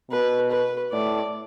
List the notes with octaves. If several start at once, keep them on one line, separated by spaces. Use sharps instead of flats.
B2 B4
B4
A2 D5